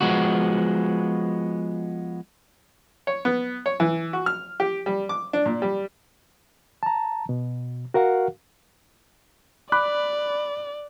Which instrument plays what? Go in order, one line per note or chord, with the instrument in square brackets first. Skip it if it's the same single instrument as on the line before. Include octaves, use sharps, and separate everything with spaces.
[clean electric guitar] F3 G#3 B3 F#4
[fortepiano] C#5
B3
C#5
E3
F#4
F6
G4
G3
D6
D4
A#2
G3
[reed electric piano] A5 A#5
B2
F#4 A#4 F5 F#5
[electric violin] D5 [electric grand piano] B5 D6 F#6